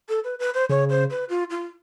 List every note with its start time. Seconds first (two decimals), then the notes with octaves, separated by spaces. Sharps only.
0.09 A4
0.24 B4
0.40 B4
0.54 C5
0.69 C#3 C#5
0.90 C5
1.11 B4
1.30 F4
1.51 F4